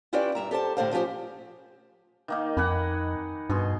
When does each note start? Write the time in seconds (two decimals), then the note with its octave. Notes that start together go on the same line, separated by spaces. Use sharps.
0.13 C#4 E4 F4 G4 B4 D5
0.35 G2 E5 A#5
0.51 G4 A4 C5 A5
0.77 A2 D3 C5 F5
0.93 F3 C#4 G4 A4 C5
2.28 D#3 A#3 D#4
2.57 F2 F#5 G#5 B5
3.50 G2 B2 G#4 C6